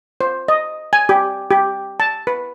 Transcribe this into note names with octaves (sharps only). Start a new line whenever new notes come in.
C5
D#5
G#5
G4
G4
A5
B4